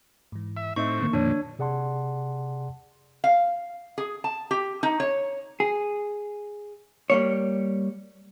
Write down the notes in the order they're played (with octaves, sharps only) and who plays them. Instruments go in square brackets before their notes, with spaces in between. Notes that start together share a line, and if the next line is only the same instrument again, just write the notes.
[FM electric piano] G#2 E3
[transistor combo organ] E5
[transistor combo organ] A2 C4 [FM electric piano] D#4 D#5 E5 [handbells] C#6
[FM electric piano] D3 D#3 A#3
[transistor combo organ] F2 A#2 [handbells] D4 C#5
[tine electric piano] C3 G#4 D5 F#5 A5 C6
[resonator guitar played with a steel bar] F5
G#4
A5
G4
D#4
C#5
[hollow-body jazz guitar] G#4
G3 A#3 C#5